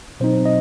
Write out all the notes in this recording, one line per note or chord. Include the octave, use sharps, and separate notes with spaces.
B2 F#3 C4 D#4 C5
D#5